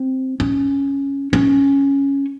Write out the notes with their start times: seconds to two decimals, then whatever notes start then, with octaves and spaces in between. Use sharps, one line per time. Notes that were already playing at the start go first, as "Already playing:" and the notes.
Already playing: C4
0.40 C#4
1.33 C#4